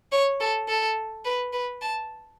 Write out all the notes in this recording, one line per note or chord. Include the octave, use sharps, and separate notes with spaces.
C#5
A4
A4
B4
B4
A5